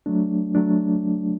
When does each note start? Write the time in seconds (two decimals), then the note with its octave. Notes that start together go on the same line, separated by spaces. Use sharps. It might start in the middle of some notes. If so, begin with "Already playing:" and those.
0.06 F#3 A3 D4
0.55 F#3 A3 D4